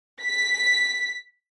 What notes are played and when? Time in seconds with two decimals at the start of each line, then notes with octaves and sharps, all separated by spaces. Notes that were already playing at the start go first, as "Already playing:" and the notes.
0.23 B6